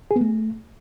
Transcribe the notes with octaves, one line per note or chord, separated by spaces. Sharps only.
G#4
B3
A3